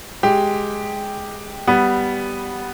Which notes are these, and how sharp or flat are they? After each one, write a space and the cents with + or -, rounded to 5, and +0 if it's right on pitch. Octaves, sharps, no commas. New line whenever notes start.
G#3 +5 G4 +0
G3 +0 B3 +0